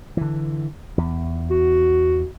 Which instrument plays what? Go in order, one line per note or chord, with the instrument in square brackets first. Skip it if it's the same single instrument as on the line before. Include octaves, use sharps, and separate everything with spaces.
[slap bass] D3 E3
E2
[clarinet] F#4